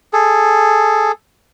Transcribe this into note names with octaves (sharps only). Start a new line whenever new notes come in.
G#4 A4